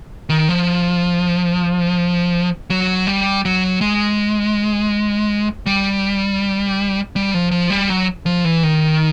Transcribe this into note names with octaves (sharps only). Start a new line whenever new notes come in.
D#3
F3
F#3
G3
F#3
G#3
G3
G3
F3
F3
G3
F#3
F3
E3
D#3